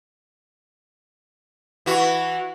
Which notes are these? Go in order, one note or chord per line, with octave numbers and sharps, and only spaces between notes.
E3 F#4